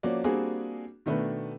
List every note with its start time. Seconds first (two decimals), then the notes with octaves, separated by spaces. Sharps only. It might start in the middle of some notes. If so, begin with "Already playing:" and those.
0.03 F3 A#3 C#4 F#4 D5
0.24 G3 A#3 C4 D4 F#4 G#4
1.06 B2 D#3 A3 D4 B4